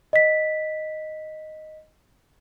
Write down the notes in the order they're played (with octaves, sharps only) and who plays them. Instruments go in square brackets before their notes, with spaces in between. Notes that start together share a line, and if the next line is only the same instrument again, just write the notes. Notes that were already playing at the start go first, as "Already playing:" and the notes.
[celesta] D#5 B6